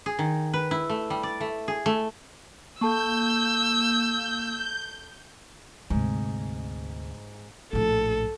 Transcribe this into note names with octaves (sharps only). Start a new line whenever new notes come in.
G#4
D#3
B4
E4
A3
G3
D5
A3
G#4
A3
A#3 A4 A5 C#6 E6 G6
D2 G#2 C3
A#1 A2 A4